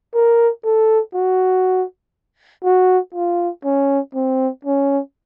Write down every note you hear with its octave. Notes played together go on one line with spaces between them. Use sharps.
A#4
A4
F#4
F#4
F4
C#4
C4
C#4